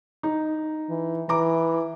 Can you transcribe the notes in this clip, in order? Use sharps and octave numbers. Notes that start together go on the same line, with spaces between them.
D#4
E3
E3 A#5 D6